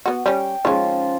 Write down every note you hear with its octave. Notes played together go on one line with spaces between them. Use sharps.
B3 F#4
G3 C#4 G5
D#3 F3 G#3 C#4 F4